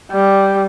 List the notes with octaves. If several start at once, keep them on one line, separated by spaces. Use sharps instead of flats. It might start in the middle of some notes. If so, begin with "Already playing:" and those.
G3